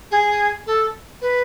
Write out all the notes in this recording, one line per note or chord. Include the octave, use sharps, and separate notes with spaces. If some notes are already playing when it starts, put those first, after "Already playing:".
G#4
A4
B4